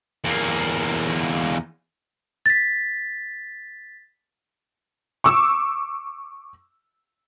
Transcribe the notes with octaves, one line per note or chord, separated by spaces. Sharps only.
E2 A#3
A6 B6
C#6 D6 E6